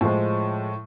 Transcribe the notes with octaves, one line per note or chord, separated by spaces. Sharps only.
A2 F3 G#3